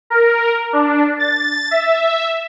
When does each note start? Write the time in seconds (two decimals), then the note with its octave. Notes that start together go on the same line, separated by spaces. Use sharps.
0.10 A#4
0.73 D4
1.20 A6
1.71 E5